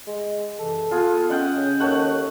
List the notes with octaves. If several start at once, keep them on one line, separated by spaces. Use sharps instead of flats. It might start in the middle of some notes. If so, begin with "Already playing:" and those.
G#3
F#2 C3 E3 A4
B3 F4 G#4 F#5
C#4 D#5 F#5 G5
C#3
D#2 A3 C#5 F#5